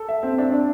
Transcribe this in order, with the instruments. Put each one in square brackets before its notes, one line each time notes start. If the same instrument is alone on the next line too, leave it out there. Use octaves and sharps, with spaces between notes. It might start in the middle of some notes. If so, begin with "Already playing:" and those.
Already playing: [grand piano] A4
E5
C4
D4
D4